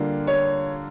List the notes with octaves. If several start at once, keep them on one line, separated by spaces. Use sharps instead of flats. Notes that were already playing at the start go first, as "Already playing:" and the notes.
Already playing: D3 G3 A#3 F4
C#5